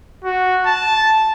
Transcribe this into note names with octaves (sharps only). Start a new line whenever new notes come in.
F#4
A5